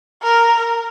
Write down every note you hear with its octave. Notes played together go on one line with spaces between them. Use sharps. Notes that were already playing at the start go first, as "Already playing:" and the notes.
A#4